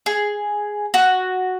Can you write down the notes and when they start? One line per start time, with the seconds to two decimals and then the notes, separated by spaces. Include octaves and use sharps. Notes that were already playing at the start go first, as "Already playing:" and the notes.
0.06 G#4
0.94 F#4